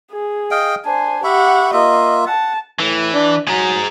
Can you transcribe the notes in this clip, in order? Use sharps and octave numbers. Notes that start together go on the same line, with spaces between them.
G#4
D#5 F5 G5
D4 C5 G#5
G4 E5 F#5 B5 C#6
A#3 F4 D#5 E5
F#5 A5
A2 E3
D4
F#3 G#4 A#5